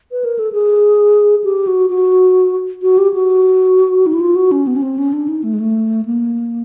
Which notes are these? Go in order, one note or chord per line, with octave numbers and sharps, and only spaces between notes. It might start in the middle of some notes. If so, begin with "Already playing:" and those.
B4
A#4
A4
G#4
G4
F#4
F#4
F#4
G4
F#4
D#4
E4
F4
F#4
C#4
B3
C#4
C4
C#4
D4
D#4
A3
G#3
A3
A#3